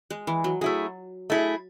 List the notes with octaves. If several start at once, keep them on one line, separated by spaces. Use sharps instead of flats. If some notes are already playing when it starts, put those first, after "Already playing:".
G#3
E3
F#3
F#3 A3 E4 G#4
A3 E4 G#4